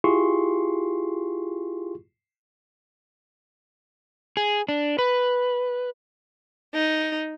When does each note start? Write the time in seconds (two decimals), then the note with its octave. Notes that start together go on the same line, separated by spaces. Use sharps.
0.04 E4 F4 G4 G#4 C6 C#6
4.37 G#4
4.69 D4
4.98 B4
6.74 D#4